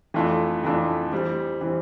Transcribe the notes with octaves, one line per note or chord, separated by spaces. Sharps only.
F2 E3 A3 D4 F4
F2 E3 A3 D4 F4
E3 G3 C4
E3 G3 C4